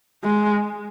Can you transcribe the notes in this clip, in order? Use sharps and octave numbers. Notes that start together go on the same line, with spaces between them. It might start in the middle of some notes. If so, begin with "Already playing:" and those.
G#3